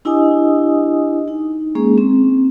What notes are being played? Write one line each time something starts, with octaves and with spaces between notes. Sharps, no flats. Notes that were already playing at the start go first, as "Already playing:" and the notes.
D4 E4 G4 D#5 G#5 D#6
D#4
G#3 A#3 C#4 G#4
C4